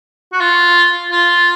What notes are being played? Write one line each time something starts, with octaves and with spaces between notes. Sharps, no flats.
F#4
F4
F4